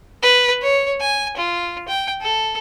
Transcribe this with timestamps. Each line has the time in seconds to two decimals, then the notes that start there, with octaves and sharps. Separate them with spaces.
0.22 B4
0.62 C#5
1.01 G#5
1.37 F4
1.89 G5
2.22 A4